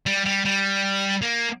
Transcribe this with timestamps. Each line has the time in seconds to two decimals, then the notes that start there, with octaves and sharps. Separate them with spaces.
0.06 G3
0.26 G3
0.45 G3
1.22 A#3